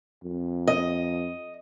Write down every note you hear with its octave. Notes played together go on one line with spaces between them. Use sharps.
F2
D#5